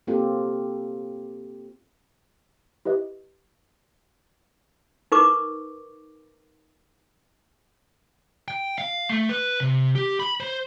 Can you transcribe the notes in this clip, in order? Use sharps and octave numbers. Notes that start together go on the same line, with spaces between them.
A#3 C4 F4 G4 A4
E4 G4 B4 D#5
D#4 A#4 B4 C#6 D6
G5
F5
A3
B4
C3
G4
B5
C5